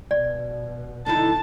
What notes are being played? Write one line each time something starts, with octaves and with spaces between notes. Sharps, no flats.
B2 D5
D3 D#4 E4 A5